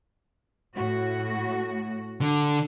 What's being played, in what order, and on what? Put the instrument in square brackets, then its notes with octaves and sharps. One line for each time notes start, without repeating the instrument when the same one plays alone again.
[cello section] A2 F#4
[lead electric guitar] D3